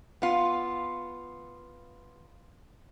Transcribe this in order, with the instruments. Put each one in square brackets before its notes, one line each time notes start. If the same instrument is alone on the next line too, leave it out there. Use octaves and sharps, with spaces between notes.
[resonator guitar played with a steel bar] B3 F4